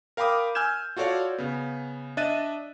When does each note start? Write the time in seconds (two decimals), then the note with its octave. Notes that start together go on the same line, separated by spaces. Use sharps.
0.17 A#4 F5 G5 B5 D6 D#6
0.55 G#5 E6 F6 G6 G#6 E7
0.97 F4 F#4 A4 C#5 D5 F5
1.38 C#3 B3
2.17 D4 D#5 E5 F#6 A6 D#7